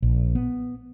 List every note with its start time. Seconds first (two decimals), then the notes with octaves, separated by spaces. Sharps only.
0.02 A#1
0.35 B3